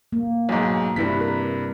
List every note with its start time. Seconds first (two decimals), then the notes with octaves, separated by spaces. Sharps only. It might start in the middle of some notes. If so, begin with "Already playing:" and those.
0.13 A#3
0.49 B1 G#2
0.96 G2 C3 C4 E4 B4 B6
1.21 A#4